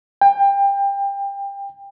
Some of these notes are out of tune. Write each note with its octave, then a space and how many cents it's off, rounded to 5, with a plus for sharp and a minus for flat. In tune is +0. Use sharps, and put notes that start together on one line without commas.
G5 +25